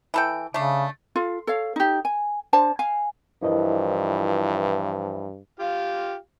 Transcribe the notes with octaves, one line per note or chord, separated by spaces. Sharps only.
E3 A4 G5
C#3 A3 D4
F4 A4 F5
A4 C#5 F5
D#4 G4
G#5
D4 C5 A5
F5 G#5
G2 E3 F3 E4 A#4 D#5
F4 G4 F5